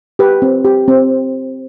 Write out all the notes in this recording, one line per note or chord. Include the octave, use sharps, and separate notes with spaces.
G4 B4
C4
G4
C4